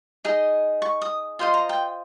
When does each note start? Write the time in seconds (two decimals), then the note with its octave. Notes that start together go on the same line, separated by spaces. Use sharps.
0.25 D#4 G#4 D#5
0.82 C#6
1.02 D#6
1.39 F4 C5 D#5 C6
1.54 A#5
1.69 G5